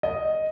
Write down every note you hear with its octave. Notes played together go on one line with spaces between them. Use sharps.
D#5